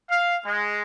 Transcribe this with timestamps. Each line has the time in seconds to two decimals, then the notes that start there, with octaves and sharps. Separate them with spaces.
0.10 F5
0.45 G#3